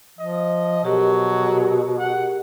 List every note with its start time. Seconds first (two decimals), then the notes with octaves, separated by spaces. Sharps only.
0.19 F3 D#5
0.85 B2 F#3 G4 G#4 A#4
1.99 F#5